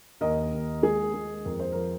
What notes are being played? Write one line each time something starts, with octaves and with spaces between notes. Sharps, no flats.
D#2 A#4 D#5
D#2
G#3 G#4
G#3
F2 A#4
C5
F3 A#4